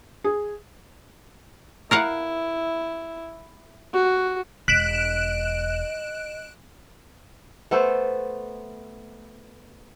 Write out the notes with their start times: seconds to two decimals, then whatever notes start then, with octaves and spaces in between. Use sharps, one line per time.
0.24 G#4
1.91 E4 A#4 F5 F#5
3.93 F#4
4.68 E1 D#5 F#6 B6 D7 E7
7.71 A3 B3 A4 C5